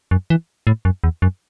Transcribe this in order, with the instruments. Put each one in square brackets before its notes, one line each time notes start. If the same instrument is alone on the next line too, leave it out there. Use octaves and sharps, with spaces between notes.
[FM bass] F#2
E3
A2
F#2
E2
F#2